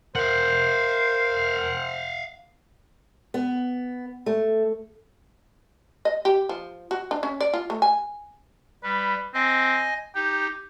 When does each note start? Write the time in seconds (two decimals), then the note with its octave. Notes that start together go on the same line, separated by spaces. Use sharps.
0.16 A#4 C5 F5 F#5
3.34 B3
4.26 A3
6.05 D#5
6.25 G4
6.49 F3
6.91 F#4
7.11 D4
7.23 C#4
7.41 D5
7.54 F4
7.70 A3
7.82 G#5
8.83 G3 B4
9.34 C4 D#5 G#5
10.15 D#4 G4 G5